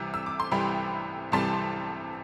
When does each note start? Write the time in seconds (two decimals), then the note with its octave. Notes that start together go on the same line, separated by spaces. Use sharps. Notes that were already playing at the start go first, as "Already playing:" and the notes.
Already playing: C2 C3 E3 G3
0.14 E6
0.26 D6
0.40 C6
0.51 C2 C3 E3 G3 G5 B5
1.32 C2 C3 E3 G3 A5 C6